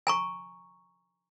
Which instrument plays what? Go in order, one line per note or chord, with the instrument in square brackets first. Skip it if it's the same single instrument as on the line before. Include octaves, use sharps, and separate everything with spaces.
[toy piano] G#5 A#5 C#6